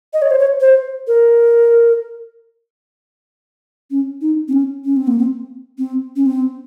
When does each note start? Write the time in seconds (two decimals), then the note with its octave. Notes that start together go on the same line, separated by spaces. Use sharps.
0.13 D#5
0.22 C#5
0.31 C5
0.39 C#5
0.61 C5
1.08 A#4
3.91 C#4
4.22 D#4
4.48 C4
4.53 C#4
4.85 C#4
4.96 C4
5.07 A#3
5.19 C4
5.78 C4
6.16 C#4
6.26 C4